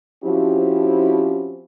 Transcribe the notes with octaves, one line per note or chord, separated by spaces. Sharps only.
F3 C4 C#4 E4 F#4 G4